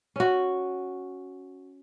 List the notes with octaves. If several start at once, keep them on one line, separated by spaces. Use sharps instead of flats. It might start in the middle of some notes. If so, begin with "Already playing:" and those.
C#4 F#4